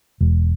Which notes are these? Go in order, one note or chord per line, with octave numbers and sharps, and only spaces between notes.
E1